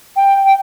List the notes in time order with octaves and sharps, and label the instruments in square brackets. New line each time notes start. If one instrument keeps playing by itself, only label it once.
[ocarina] G5